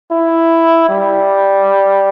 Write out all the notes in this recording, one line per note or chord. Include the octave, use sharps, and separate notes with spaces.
E4
G3